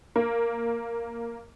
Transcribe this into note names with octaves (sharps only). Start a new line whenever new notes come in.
A#3